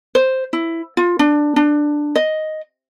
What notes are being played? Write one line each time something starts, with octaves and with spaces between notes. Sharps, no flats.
C5
E4
F4
D4
D4
D#5